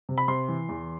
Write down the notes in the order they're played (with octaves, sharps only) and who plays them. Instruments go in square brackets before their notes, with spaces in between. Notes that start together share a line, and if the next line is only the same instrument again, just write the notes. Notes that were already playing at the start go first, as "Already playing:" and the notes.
[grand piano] C3
B5
C3 C6
E3
E2